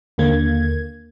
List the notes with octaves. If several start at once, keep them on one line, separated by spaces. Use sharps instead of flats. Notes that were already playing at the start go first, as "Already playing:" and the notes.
D#2 D3 A#3 G#6